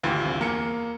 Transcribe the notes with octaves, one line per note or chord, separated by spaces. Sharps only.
G#1 D2 E3 F4 G4
C2
E2 A#3 C#7